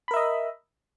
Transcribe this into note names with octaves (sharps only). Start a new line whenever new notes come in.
A#4 D#5 E5 B5